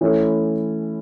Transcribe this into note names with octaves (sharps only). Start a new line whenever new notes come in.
E3 A3 C#4 E4